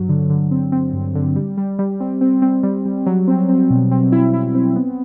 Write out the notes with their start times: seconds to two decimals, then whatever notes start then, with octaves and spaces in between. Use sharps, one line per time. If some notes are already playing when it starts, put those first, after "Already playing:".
Already playing: G2 F#3
0.09 D3
0.30 D3
0.51 C4
0.72 C4
0.93 G2
1.15 D3
1.36 G3
1.57 G3
1.79 G3
2.00 C4
2.21 C4
2.42 C4
2.63 G3
2.85 G3
3.06 F#3
3.28 C4
3.49 C4
3.70 B2
3.91 C4
4.12 E4
4.34 E4
4.55 C4
4.76 B3